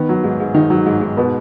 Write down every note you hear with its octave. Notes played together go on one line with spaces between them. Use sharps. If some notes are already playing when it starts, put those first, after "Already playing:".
Already playing: D#3 B3
F#3
G#2
G#2
D#3 D#4
F#3
G#2
G#2
B2 B4